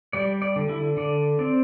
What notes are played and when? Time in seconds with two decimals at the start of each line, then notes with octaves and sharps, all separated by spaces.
0.13 G3 D5
0.42 D5
0.56 D3
0.69 E4
0.97 D3 D5
1.39 C4 D5